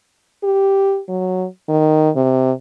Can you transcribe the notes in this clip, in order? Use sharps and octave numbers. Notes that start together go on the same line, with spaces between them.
G4
F#3
D#3
C3